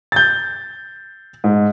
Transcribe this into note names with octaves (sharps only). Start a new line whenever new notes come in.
G6 A6
G#2